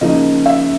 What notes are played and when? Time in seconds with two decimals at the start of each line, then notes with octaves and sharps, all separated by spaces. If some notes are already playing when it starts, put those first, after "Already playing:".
0.01 C#3 F3 A#3 D#4 D#5
0.46 E5